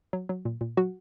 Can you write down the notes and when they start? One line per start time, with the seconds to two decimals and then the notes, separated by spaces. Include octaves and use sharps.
0.13 F#3
0.29 F#3
0.45 A#2
0.61 A#2
0.77 F#3 F#4